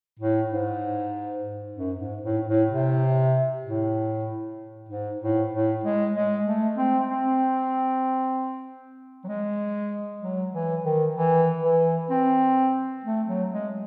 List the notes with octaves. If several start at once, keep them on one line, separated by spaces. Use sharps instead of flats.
A2
G#2
F#2
G#2
A2
A2
C3
A2
G#2
A2
A2
G#3
G#3
A3
C4
C4
F#3
G#3
F#3
E3
D#3
E3
E3
C4
A3
F#3
G#3